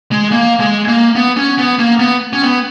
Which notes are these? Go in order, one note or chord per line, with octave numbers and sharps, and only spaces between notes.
G#3
A#3
G#3
A#3
B3
C#4
B3
A#3
B3
C#4
B3